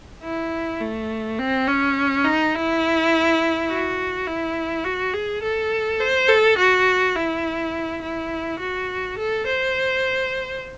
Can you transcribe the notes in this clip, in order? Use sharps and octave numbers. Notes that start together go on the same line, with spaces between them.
E4
A3
C4
C#4
D#4
E4
F#4
E4
F#4
G#4
A4
C5
A4
F#4
E4
E4
F#4
A4
C5